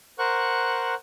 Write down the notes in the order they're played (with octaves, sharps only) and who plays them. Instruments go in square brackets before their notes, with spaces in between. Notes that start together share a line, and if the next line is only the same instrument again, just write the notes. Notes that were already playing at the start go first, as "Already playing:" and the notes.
[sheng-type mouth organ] A#4 C5 F#5 C#6 F#6